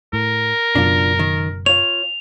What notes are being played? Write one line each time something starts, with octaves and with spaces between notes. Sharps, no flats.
A2 A#4
F#1 F#2 B2 D4 F4
D#3
F4 C#5 F7